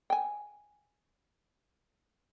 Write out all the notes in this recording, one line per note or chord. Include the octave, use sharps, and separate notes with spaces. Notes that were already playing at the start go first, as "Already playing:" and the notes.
G5 G#5